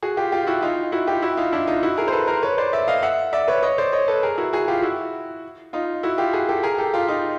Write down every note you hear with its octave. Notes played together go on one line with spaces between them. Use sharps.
F#4 G#4
F4 G4
F4 G4
F4
E4 F#4
D#4 F4
E4 F#4
F4 G4
E4 F#4
D#4 F4
D4 E4
D#4 F4
E4 F#4
G#4 A#4
C5
A4 B4
A#4 C5
B4 C#5
C5 D5
D5 E5
D#5 F5
E5 F#5
D5 E5
B4 C#5
C#5 D#5
C5 D5
C#5 D#5
A4 B4
G#4 A#4
E4 F#4
F#4 G#4
F4 G4
E4 F#4
D#4 F4
E4 F#4
F4 G4
F#4 G#4
G4 A4
G#4 A#4
G4 A4
F4 G4
D#4 F4